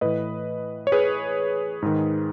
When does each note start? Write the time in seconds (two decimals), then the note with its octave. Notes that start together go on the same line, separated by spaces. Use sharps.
0.01 A2 E3 B4 D#5
0.87 C#5
0.92 G#4 B4
1.82 G#2 D#3